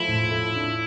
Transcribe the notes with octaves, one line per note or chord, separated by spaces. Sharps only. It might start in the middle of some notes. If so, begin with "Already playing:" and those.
Already playing: F3 A3 E4
A2
A3
D4